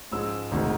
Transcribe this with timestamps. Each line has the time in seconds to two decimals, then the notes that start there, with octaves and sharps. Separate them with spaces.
0.12 G#2 F3 G#3 C#4 E6
0.51 E1 D2 C3 D#3